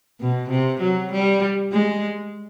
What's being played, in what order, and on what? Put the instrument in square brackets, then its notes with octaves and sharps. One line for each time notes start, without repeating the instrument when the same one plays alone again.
[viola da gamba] B2
C3
F#3
G3
G#3